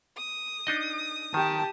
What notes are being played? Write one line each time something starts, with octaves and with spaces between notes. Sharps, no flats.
D#6
D4 D#4 D#5
D#3 G4 A5